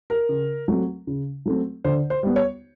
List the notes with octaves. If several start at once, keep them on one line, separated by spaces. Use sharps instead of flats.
A#4
C#3
F#3 A3 C4
C#3
F#3 A3 C4
D3 C5
C5
G3 B3
C#5